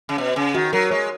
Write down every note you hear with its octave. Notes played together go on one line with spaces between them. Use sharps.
C#3
B2 C#5
C#3 G#5
D#3 F#4
F#3 A#4
G#3 C#5